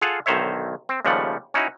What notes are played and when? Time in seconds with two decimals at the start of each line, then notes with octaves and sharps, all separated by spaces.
0.02 F4 G#4 A4 F5 F#5
0.26 B1 D3 D#3 C5 C#5 E5
0.89 C4
1.05 D#2 C#3 F3 G3 A3 F#5
1.54 C#4 D#4 E4 F#4